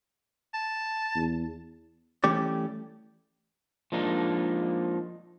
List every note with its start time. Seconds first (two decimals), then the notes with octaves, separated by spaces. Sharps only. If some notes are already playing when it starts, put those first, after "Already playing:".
0.54 A5
1.15 E2
2.24 E3 G3 A3 C#4 G4 D5
3.92 F3 G#3 A#3 D4 D#4